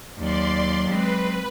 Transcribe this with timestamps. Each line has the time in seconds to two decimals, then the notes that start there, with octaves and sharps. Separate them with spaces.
0.18 D#2 F#3 D5 C6
0.90 G#3 C4 B4